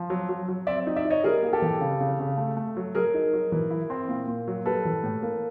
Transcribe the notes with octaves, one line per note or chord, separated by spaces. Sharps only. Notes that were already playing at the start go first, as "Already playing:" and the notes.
Already playing: F3
F#3
F#3
F#3
C4 D5 E5
D#4
D5 E5
D#4
C#5 D#5
G3 G#4 A#4
A#3
G4 A4
E3
C#3
C#3
C#3
A3
A3
F#3
F#3 G#4 A#4
D#4
F#3
E3
E4
C4
A#2
A#2
F#3
G3 A4 B4
E3
A2
A#3